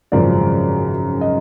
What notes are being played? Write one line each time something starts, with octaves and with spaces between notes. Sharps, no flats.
G#1 F#2 C#3 F3 D5
D#5